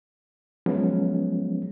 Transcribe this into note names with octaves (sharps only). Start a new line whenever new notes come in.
F3 F#3 G#3 B3 C#4